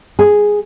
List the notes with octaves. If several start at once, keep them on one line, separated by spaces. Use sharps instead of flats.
G#4